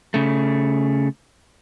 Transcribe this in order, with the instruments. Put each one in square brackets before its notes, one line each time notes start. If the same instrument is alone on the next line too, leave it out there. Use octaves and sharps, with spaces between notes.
[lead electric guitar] C#3 A3